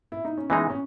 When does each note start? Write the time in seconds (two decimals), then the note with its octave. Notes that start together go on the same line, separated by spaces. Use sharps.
0.12 E4
0.25 D#4
0.38 C#4
0.50 E3 G#3 B3 D#4
0.70 C#4